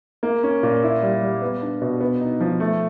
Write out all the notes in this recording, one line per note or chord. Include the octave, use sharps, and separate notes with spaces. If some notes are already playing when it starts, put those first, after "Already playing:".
A#3
C#4
A#2
E4
G3
G3
B3
D4
B2
B3
D#4
F3
A3